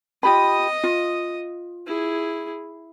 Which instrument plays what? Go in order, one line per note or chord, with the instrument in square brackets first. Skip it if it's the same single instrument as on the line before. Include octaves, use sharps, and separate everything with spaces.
[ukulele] F4 G4 B5 [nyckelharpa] D#5 D#6
[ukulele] F4
[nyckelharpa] E4 G#4